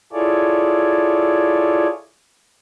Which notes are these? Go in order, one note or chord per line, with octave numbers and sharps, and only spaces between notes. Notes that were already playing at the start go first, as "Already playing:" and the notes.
E4 F4 G#4 A4 C#5 D5